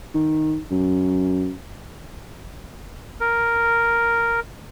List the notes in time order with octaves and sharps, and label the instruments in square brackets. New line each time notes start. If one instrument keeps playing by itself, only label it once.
[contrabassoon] D#3
F#2
[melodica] A#4